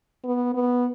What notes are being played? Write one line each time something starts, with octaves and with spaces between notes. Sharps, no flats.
B3
B3